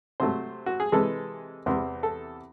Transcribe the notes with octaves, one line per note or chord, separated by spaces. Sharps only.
C3 F#3 A3 C5
F#4
G#4
C3 E3 G#3 A4
E2 C3 E3 C5
A4